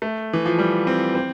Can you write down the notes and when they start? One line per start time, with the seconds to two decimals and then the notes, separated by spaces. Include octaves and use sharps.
0.02 A3
0.33 E3
0.46 F3
0.59 G3
0.87 C4
1.15 C4